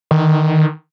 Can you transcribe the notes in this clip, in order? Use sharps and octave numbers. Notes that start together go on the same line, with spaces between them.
D#3